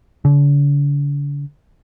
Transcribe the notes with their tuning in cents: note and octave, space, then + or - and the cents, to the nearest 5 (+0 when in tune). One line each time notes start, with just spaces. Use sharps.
D3 -45